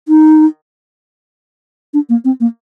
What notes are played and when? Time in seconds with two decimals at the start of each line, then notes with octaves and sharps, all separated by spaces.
0.08 D#4
1.94 D4
2.09 A#3
2.25 C4
2.40 A#3